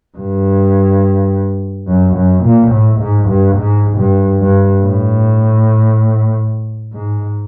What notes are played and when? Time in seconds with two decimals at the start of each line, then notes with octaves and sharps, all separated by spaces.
0.18 G2
1.88 F#2
2.16 F#2
2.43 A#2
2.71 A2
3.00 G#2
3.28 G2
3.56 G#2
3.97 G2
4.40 G2
4.82 A2
6.93 G#2